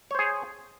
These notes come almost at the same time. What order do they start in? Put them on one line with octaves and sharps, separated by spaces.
C#5 C5 G#4